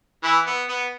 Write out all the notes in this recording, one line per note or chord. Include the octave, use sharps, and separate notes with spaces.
E3 E4
B3
B3